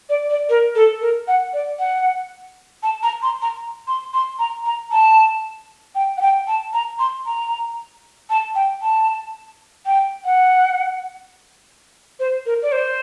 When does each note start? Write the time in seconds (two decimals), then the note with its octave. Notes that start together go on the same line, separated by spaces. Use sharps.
0.09 D5
0.30 D5
0.49 A#4
0.75 A4
1.01 A#4
1.28 F#5
1.53 D5
1.79 F#5
2.83 A5
3.03 A#5
3.22 C6
3.42 A#5
3.87 C6
4.14 C6
4.39 A#5
4.66 A#5
4.92 A5
5.95 G5
6.17 F#5
6.21 G5
6.47 A5
6.73 A#5
6.99 C6
7.26 A#5
8.30 A5
8.55 G5
8.82 A5
9.86 G5
10.25 F#5
12.19 C5
12.46 A#4
12.62 D5
12.72 C5